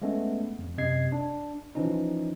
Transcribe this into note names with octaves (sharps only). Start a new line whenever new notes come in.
G#3 A3 B3 C#4
F2
F#2 C3 D#5 G#6 C7
D4
E3 F3 C#4 D#4